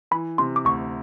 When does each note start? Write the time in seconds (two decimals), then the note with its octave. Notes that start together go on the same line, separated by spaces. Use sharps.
0.11 E3 B5
0.38 C3 C6
0.56 D6
0.65 D2 C#6